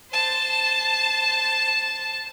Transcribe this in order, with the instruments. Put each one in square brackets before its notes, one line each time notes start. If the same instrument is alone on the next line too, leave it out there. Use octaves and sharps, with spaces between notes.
[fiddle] C5 A5